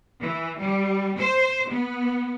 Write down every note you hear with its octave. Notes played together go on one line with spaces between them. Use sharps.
E3
G3
C5
B3